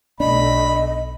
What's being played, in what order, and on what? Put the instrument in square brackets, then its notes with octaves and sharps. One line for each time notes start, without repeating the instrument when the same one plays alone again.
[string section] B1 A3 [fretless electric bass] D4 [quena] D#5 [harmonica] B5